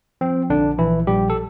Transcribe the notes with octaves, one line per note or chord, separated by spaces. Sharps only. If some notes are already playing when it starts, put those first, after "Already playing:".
F3 C4
A#1 D3 D4
A#1 E3 E4
A#1 G3 G4
A4